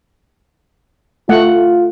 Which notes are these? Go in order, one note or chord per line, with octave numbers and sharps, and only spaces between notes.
A3 F4 F#5